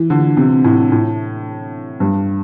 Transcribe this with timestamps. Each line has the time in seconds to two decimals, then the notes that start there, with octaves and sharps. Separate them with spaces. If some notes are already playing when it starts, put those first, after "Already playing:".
Already playing: E3
0.10 D3
0.37 C3
0.64 A2
0.92 A2
2.00 G2